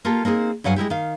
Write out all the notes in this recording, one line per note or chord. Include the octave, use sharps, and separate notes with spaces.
A#3 F4 G4 A4
A#3 C4 D#4 G#4
G2 F#3 F5 F#5 G#5
G#3 A#3 E4 G4
D#3 F5